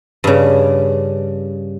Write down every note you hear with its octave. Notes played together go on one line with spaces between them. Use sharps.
G2 C#3